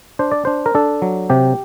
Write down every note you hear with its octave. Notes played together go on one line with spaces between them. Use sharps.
D4 C5
D5
D4 C5
A#4
D4 A4
F#3
C3 G4